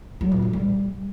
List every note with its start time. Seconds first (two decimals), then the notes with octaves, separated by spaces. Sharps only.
0.21 F#3
0.32 A#2
0.42 D3
0.53 G3